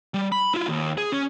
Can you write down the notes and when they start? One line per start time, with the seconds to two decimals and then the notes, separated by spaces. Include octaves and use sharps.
0.14 G3
0.32 B5
0.54 E4 F4
0.68 D#2
0.98 G#4
1.12 C#4